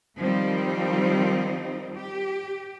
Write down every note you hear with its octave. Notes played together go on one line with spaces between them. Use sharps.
D#3 F3 G3 C4 D#4
G4